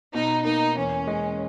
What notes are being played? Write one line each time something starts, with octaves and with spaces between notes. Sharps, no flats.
B2 D#4
A#3 D#4
E2 C#4
G#3